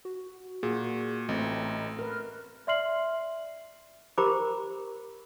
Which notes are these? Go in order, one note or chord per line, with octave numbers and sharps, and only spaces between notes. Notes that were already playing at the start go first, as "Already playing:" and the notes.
F#4
A#2 F#4 G#4
A1 A3 C4 D#5
A#4 B4 F6
D5 E5 C6 F6 C7 F#7
G4 A#4 C5 A#5 B5 D6